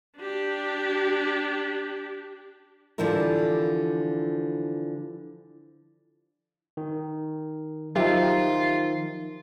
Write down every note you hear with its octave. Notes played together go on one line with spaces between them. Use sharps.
D4 G4
D3 E3 F3 G3 E4 A#4
D#3
D#3 F3 F#3 D#4 F4 G4 E5